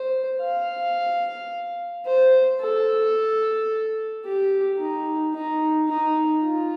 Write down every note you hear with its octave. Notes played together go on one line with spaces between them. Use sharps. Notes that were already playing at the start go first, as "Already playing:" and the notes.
Already playing: C5
F5
C5
A4
G4
D#4
D#4
D#4
F4